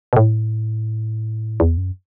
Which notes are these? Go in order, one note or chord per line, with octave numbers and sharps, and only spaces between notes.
B2
A2
E2
F#2